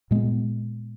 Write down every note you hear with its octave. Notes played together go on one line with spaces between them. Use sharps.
A#2 G#3 B3